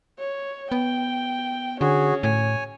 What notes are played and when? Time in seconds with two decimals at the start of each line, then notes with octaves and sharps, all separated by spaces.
0.19 C#5
0.72 B3 G5
1.81 D3 C#4 F#4 G#4
2.23 A2 C#5 G#5